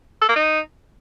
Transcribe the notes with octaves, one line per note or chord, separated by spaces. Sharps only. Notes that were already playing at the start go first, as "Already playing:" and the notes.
A4
A#3
D#4